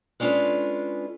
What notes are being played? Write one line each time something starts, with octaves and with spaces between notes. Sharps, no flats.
G#3 C#4 D4 F4 A4 B4